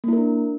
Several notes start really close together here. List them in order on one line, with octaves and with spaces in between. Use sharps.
A#3 E4 A#4 D4